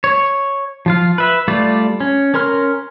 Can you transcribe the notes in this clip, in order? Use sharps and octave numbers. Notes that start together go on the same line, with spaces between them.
C#5
F3 F4 F5
B4 E5
G3 A3 F4 D5
C#4
C#4 A#4 C6 F6